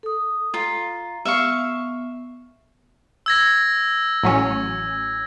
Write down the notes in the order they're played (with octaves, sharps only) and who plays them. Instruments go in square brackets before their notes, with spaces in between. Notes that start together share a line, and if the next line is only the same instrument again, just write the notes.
[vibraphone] A4 D#6
[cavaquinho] F4 [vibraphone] A#5
[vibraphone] B3 [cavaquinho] E5 F5 C#6
[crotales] E6 G#6 A#6
[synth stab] A1 F#3 C#4